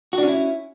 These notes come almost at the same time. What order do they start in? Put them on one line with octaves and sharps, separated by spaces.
F#4 D4 C#4 E4